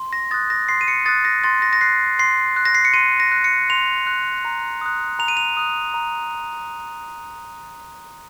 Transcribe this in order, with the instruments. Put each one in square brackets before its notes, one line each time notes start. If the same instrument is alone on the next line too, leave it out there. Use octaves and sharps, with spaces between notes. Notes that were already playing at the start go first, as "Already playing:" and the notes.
Already playing: [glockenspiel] C6
A#6
D#6 F#6 A6
A#6
C6 C7
D#7
C#7
D#6 F#6 A6
A#6
C6 A6
A#6
A#6
F#6 C7
C6 C7
F#6
A#6
C7
C#7
C6 D#7
A#6
F#6
C#7
C6 F7
F#6
A#5
D#6 F#6
A#5 F7
D#7
F7
D#6 F#6
A#5